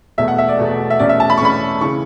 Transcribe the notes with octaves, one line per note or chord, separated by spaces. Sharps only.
E2 B2 A3 E5
F#5
E5
D5
E2 B2 A3
E5
E2 B2 A3 C#4 D5
E5
A5
B5
C#6
E2 B2 A3 C#4 B5
C#3 E3 C#6